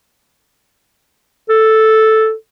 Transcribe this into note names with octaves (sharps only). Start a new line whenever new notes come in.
A4